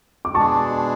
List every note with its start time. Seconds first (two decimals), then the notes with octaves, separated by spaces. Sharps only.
0.25 D6
0.34 B2 G#3 D4 G#4 A5 C#6